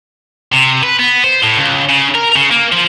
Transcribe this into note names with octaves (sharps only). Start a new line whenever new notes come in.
C3
B4
B3
C5
A2
C#2
C#3
A#4
C#3
A#3
F3